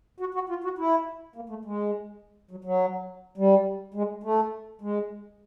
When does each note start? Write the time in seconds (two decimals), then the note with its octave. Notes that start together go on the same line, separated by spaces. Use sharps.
0.20 F#4
0.34 F#4
0.49 F4
0.64 F#4
0.78 E4
1.36 A#3
1.49 A3
1.65 G#3
2.51 F#3
2.64 F#3
3.38 G3
3.94 G#3
4.23 A3
4.81 G#3